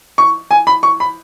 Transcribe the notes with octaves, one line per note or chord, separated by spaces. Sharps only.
C#6
G#5
B5
C#6
B5